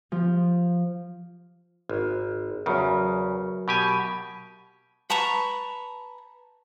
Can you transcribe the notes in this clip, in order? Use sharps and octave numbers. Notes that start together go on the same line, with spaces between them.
F3
G#1
E2 C#3 F#3 A#4
B2 G4 G#5
B4 A5 A#5 C#6